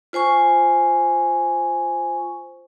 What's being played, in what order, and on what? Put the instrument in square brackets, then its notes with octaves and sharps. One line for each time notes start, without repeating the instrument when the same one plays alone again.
[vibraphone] F4 C5 G#5 C#6